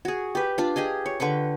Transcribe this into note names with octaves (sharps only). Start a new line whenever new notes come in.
F#4 G#4
G4 B4
D4 F4
G4 G#4 D#5 G#5
C#5
D3 B4 G5 C#6